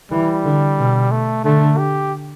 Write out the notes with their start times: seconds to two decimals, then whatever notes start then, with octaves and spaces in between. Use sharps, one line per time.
0.11 E3 G3
0.45 D3
0.78 B2
1.11 A3
1.44 D3 A3
1.78 G4